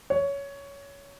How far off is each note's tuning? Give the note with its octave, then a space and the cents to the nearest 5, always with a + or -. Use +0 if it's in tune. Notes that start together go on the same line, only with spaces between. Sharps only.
C#5 +15